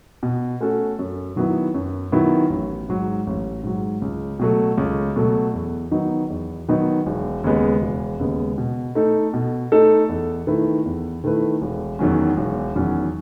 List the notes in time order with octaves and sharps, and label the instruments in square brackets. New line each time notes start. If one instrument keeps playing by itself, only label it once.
[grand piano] B2
A3 C#4 F#4 A4
F#2
D#3 F#3 B3 E4
F#2
D#3 F#3 B3 E4
A1
G#2 F#3
A1
G#2 F#3
C#2
B2 F#3 A3
C#2
B2 F#3 A3
E2
D#3 F#3 B3 D#4
E2
D#3 F#3 B3 D#4
E1
D#2 C#3 G#3 B3
E1
D#2 C#3 G#3 B3
B2
A3 D#4 A4
B2
A3 D#4 A4
E2
D#3 A3 E4 B4
E2
D#3 A3 E4 B4
E1
E2 D#3 F#3 C#4
E1
E2 D#3 F#3 C#4